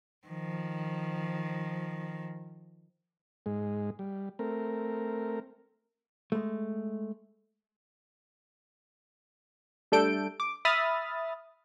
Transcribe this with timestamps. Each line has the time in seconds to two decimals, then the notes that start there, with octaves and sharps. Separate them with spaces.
0.28 D#3 F3
3.46 G#2 G#3
3.99 G3
4.39 A3 C4 A#4
6.32 G#3 A3
9.92 G3 A3 D4 A4 G6 D7
10.40 D6
10.65 E5 B5 D#6 F6 A6